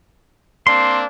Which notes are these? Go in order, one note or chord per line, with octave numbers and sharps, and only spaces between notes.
A#3 C4 D4 C6